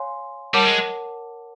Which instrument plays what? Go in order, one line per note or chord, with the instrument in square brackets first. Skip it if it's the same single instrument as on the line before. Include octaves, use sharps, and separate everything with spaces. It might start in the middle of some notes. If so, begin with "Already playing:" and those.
Already playing: [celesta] C#5 F5 G#5 C6
[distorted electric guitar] G3 [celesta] A#4 C#5 F#5 A5 D6
[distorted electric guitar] G#3